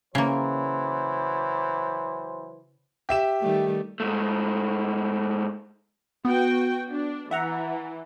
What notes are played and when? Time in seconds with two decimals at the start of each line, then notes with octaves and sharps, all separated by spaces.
0.15 C#3 E3 F#3 A#3 C5
3.09 G4 E5 E7
3.41 D#3 G3 A3
4.00 G#2 A3
6.25 B3 F#4 G5
6.91 D4
7.31 E3 E5 F#5 A#5